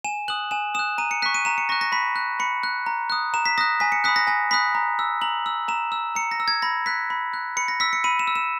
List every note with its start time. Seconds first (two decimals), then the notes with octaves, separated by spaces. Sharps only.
0.04 G#5 E7
0.28 D#6 F#6 F#7
0.51 G#5 E7
0.75 D#6 F#6 E7
0.98 A#5 D#7
1.11 C#7
1.22 C#6 F#6 B6
1.34 D#7
1.45 A#5 E7
1.58 C#7
1.69 C#6 F#6 A#6
1.81 A#6
1.92 B5 B6
2.16 F#6
2.40 B5 C#7
2.63 F#6
2.86 A#5
3.10 D#6 F#6
3.34 A#5 E7
3.46 B6
3.58 D#6 F#6 A#6
3.80 G#5 B6
3.92 C#7
4.04 B5 D#6 F#6 B6
4.16 A#6
4.27 G#5 A#6
4.51 B5 D#6 F#6 B6
4.75 A#5
4.99 E6
5.21 A#5 F#7
5.46 E6
5.68 A#5 E7
5.92 E6
6.15 A#5 C#7
6.31 A#6
6.40 E6
6.48 G#6
6.62 B5 A#6
6.86 F#6 B6
7.10 B5
7.34 F#6
7.57 B5 C#7
7.68 A#6
7.80 E6 B6
7.93 C#7
8.04 B5 D#7
8.19 E7
8.27 E6
8.35 E7